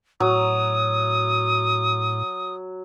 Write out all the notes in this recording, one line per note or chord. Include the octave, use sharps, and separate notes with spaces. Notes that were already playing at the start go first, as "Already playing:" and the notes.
A2 F#3 D#6